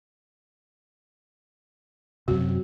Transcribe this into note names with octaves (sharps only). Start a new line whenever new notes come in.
F#2 C3 F#4